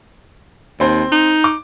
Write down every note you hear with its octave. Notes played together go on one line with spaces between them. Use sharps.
D#2 C4 C5
D#4
D6